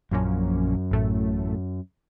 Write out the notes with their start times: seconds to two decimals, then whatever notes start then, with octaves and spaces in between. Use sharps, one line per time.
0.11 A#1 F#2 A#2 F3 A#3 C#4
0.91 A1 A2 A3